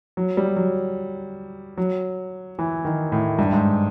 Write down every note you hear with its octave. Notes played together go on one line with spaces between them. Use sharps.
F#3
G3
F#3
F#3
E3
D#3
A2
G2
G#2